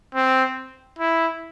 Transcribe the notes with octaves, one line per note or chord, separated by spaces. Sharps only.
C4
E4